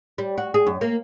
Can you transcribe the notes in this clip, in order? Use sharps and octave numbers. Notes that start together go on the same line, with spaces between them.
G3
F#4
G#4
F#2
A#3